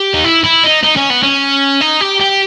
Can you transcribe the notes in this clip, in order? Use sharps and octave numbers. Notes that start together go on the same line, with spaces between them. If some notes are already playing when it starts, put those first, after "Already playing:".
Already playing: G4
D#4
E4
E4
D#4
D#4
C#4
B3
C#4
D#4
G4
G4